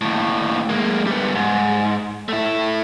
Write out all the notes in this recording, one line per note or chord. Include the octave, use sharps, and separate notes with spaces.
D#2 A2
G#3 A#3
G3 B3
G#2
A3 E4